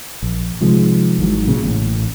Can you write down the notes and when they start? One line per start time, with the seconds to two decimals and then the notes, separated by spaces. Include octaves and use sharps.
0.22 A#1
0.60 C3 D#3 F3 G#3
1.19 G#1 G#2 E3 F#3
1.48 A#2 C#3
1.64 A1 A2